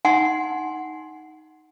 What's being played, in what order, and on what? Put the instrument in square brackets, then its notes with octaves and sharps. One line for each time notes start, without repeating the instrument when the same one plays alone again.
[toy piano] D#4 F#5 G#5 C6